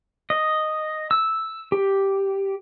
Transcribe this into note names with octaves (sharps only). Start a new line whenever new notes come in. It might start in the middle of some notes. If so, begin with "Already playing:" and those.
D#5
E6
G4